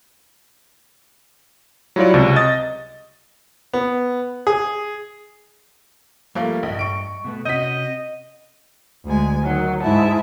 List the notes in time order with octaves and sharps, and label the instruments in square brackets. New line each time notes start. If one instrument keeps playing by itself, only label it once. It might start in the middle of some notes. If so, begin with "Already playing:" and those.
[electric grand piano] F#3 G3 E4 F4 C#5 D5
C#2 C3 C#6
D#5 D#6 A6
[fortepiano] B3
G#4
[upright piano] F3 A3 A#3 [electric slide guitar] G3
[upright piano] A#1 [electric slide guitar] G2 D#5
[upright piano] C#6 D7
[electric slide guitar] B2 A3 B3
[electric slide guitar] C3 C#4 F#4 [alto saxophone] D#5 [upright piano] G6 B6
[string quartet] D2 G#3 G#5
D#3 F#3
G#2 E4 E5 A5